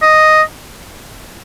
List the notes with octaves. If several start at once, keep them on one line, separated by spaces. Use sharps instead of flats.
D#5